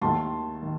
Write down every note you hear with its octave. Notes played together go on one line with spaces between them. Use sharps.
D#2 D#3 A3 A5 C6
D#3